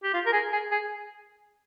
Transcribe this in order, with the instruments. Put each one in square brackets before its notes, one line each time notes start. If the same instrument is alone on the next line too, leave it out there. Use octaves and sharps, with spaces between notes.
[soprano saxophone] G4
F4
A#4
G#4
G#4
G#4